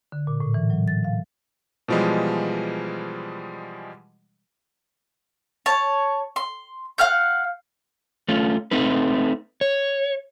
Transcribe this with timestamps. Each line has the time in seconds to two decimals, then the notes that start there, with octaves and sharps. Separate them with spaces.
0.12 D3
0.27 A#2
0.40 A2
0.54 E3
0.70 F#3
0.88 A6
1.04 F5
1.88 B2 E3 F3 G3 G#3
5.66 C#5 A5
6.36 C6
6.98 F5 F#5 F6 G6
8.28 A3 C#4 F4
8.71 A3 C4 D#4 B4
9.61 C#5